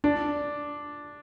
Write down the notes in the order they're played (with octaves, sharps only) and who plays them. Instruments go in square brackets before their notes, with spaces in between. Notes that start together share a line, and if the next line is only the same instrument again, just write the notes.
[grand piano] D4